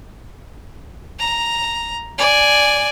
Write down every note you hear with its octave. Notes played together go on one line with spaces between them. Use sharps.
A#5
D5 G#5